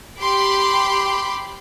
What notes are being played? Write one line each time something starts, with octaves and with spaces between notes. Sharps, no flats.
G4 B5 C6 D6